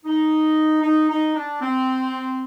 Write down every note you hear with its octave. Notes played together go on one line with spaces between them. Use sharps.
D#4
D#4
D#4
D4
C4